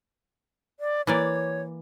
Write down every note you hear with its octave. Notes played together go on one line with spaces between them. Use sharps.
D5
E3 A#3 C#5 D5